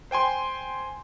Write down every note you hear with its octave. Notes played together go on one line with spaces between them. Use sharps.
C5 G5 G#5 C6